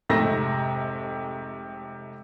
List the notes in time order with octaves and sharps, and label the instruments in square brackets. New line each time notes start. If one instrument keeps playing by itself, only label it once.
[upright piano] F1 G#2 C3 A3 E6 A#6